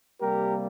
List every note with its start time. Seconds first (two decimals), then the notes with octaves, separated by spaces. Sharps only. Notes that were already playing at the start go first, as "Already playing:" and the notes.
0.20 C3 G3 A#3 G4 A#4